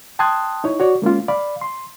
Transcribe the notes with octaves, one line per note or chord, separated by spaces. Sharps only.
G5 A5 C6 D#6 F#6 G#6
D#4 E4 C#5
F#4 C#5 D5
G#3 A#3 C#4 F4
D5 F5 B5
C6